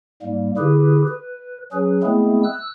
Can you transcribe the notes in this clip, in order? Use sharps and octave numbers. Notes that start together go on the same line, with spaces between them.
G#2 G3 A#3
D3 E4 G4 G#4 B4
B4
F#3 C#4 G#4 B4
G#3 A3 B3 C4 E4 G#4
E6 F#6